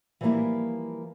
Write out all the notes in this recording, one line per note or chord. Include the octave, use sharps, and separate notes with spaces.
E3 F3 G3 A3 A#3 E4